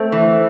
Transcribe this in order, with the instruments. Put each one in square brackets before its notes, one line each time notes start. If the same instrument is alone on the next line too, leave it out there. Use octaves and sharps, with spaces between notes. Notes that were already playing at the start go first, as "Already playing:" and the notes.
Already playing: [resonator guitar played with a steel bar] A3 C4
E3